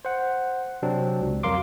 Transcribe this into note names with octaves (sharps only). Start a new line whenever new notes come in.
C5 F#5
C3 F#3 C4 D4
C#2
F2 F#3 A#4 F5 C6 D6